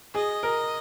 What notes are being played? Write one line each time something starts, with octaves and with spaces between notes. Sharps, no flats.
G#4 D#5
A#4